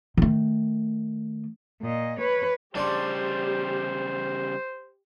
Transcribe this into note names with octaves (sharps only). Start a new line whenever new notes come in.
D#3 A3
A#2 D#5
B4 C#5
C#3 G3 D4 G4 C5 D5 C6